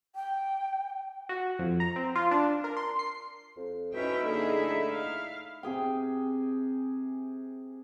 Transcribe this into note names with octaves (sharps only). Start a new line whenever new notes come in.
G5
F#4
F2
A#5
C4
F4
D4
A#4
C6
C7
F2
B2 C#4 D#4 E4 E5 G5
D3 A#3 G#4
A3
F5
C3 G#4 G5